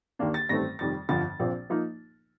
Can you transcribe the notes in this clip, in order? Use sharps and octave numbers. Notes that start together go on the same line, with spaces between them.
D#2 D#3 A#3 D4
A6
A1 G2 D#3 A3 C4 A#6
F1 F2 D#3 G3 A6
G1 F2 D3 F3 A6
A#1 A#2 F3 C4
F3 A#3 D#4